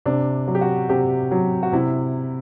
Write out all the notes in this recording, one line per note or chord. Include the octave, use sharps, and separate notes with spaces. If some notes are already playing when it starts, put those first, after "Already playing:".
C3 D4
F#3
G4
F#4
C3 G4
F#3
F#4
C3 E4